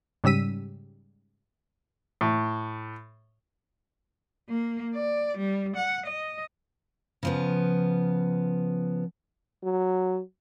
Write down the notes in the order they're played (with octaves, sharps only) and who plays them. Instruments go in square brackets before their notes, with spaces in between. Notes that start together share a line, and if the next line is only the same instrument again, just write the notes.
[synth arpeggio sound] G#2 C#3 G3 E6 B6 D#7
[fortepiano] A2
[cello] A#3
D5
G3
F#5
D#5
[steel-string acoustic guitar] C#3 F3 B3
[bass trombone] F#3